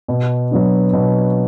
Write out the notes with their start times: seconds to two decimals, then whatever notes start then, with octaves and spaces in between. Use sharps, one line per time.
0.08 B2
0.51 F#3 B3 D4
0.93 B2